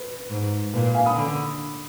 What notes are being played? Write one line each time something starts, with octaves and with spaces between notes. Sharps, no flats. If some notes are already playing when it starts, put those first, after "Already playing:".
Already playing: B4
G#2
A#2 B4
F5 G#5
B5 D#6
D3